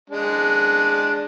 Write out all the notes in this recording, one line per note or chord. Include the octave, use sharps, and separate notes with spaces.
G#3 D4